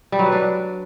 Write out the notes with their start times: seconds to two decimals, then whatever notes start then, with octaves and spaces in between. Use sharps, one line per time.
0.12 G3
0.19 F#3
0.26 B4
0.32 D4